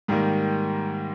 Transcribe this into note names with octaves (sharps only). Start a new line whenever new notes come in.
G#2 D#3 G3 A#3